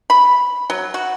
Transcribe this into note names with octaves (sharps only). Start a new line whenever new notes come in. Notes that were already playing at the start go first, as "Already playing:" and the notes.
B5
F#3
F#4